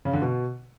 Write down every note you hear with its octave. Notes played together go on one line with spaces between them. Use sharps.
C#3
D3
B2